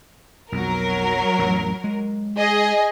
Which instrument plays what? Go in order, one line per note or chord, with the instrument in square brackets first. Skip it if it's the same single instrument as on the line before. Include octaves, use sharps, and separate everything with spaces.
[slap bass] B1 F2 [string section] F#3 A#4
[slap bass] A1 F2
G#3
[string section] G#4 D#5